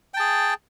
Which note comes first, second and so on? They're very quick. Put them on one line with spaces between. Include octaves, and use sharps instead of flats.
G5 A5 G#4